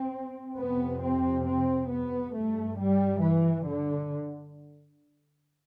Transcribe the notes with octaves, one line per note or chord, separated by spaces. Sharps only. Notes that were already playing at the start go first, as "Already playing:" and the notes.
Already playing: C4
F2 C3 B3
C4
C4
B3
G2 A3
G3
E3
D3